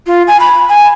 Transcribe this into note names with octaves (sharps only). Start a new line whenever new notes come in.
F4
G#5
B5
G#5